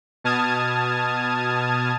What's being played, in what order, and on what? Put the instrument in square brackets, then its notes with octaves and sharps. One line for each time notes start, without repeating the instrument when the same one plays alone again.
[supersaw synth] B2 A5 D#6 F6 G#6